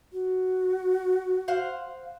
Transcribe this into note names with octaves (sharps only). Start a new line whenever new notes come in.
F#4
C5 F5 F#5